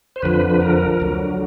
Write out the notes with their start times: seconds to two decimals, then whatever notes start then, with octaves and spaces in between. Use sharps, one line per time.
0.16 C5
0.22 F2 D3 F3 B4
0.50 B4
0.61 A#4
1.00 D2 D3 F#3